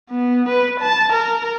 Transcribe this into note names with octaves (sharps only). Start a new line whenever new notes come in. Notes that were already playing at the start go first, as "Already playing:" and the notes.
B3
B4
A5
A#4